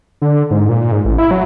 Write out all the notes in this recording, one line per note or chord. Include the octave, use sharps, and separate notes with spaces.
D3
G#2
A#2
G#2
A1
E4
F#3